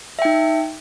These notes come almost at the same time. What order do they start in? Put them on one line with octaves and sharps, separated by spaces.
E5 G5 D#4